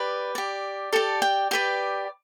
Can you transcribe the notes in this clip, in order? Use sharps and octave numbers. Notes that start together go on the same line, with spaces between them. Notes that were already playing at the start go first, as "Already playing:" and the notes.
Already playing: G4 B4 D5 B5
G4 D5
G4 A4 D5 A5
G5
G4 B4 D5 G5